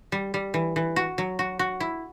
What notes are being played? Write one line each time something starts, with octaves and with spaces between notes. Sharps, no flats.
G3
G3
E3
E3
F#4
F#3
F#4
F#4
E4